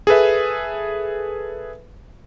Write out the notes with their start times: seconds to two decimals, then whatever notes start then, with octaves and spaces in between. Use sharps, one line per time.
0.07 G#4 A4 B4 E5